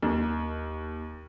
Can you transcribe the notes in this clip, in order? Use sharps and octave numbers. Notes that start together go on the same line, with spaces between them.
D#2